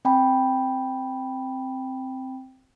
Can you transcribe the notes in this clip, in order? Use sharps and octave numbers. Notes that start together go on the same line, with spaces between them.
C4 G5 G#5 B5